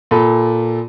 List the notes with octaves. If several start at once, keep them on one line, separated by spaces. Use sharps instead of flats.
A#2 A4 B5